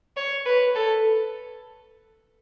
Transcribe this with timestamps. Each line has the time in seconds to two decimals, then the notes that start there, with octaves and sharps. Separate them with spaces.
0.17 C#5
0.46 B4
0.75 A4